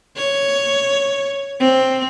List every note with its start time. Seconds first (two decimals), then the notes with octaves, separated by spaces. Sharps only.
0.17 C#5
1.60 C4